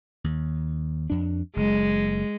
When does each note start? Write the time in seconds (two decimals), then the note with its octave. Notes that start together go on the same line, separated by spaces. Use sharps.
0.24 D#2
1.10 F2 D4
1.56 F#1 G#3